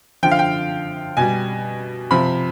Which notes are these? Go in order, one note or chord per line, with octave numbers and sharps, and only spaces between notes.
D3 F3 G5
F5
G5
B2 G3 G#5
C3 F3 B5